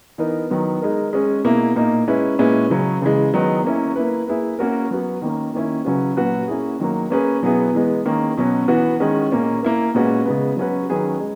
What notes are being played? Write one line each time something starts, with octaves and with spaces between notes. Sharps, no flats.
E3 B3 D#4 A#4
D#3 F#3 B3
G#3 D#4 A#4
G#3 C#4 G#4
B2 A#3 E4
A#2 A#3 D#4
G#3 C#4 E4 B4
A#2 G#3 C#4 E4 B4
C#3 F#3 C#4
C#3 E3 G#3
D#3 F#3 B3 D#4
A#3 C#4 E4
A#3 E4 B4
A#3 E4 G#4 B4
A#3 C#4 F#4 A#4
F#3 B3 F#4
D#3 A#3 C#4
D#3 A#3 C#4 E4
C#3 F#3 C#4 F#4 B4
A#2 F#3 C#4 F#4 B4
A#3 C#4 E4 G#4
D#3 F#3 A#3
A#3 C#4 G#4 B4
B2 F#3 B3 E4 G#4
E3 G#3 B3
D#3 A#3 C#4
B2 F#3 C#4
E3 B3 F#4
D#3 G#3 C#4
A#2 A#3 C#4
A#3 E4 A#4
A#2 G#3 C#4 F#4 B4
C#3 G#3 B3
F#3 C#4 F#4 B4
D#3 F#3 C#4 G#4 B4
G#3